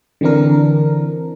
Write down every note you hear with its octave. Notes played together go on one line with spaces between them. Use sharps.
D3 E3 C4 D4 A#4